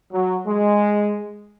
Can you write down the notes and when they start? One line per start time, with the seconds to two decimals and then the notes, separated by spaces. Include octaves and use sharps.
0.12 F#3
0.45 G#3